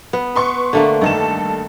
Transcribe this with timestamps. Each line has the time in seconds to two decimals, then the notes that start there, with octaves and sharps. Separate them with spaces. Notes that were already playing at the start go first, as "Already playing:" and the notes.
0.13 B3
0.36 B4 C6 C#6
0.73 D3 A3 A#3
1.01 G2 D#3 A4 E7